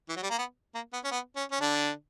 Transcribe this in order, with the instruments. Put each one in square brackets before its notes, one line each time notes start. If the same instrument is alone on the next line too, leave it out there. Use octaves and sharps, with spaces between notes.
[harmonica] E3
F#3
G3
A#3
B3
A#3
B3
C#4
B3
C#4
C#4
D3 D4